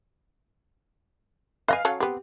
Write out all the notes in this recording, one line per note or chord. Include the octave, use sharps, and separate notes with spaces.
B4 D#5 F5 G#5
F#3 C#4 A4
B3 C4 G4